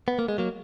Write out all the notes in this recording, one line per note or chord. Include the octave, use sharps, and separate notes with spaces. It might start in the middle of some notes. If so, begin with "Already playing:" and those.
B3
A#3
G#3
F#3 A#3